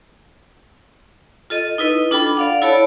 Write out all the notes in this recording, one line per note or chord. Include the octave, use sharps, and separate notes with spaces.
F4 A4 D#5
D#4 E4 B4 D#5
D4 F4 A4 G5 B5 D6
D5 F5 F#5
E4 A4 C#5 D5 A5 B5